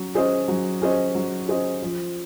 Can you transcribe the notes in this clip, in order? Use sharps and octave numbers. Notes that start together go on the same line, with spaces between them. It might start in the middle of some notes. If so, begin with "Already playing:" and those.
Already playing: F#3 C#4
C#4 G#4 C5 D#5
F#3
C#4 G#4 C5 D#5
F#3
C#4 G#4 C5 D#5
F3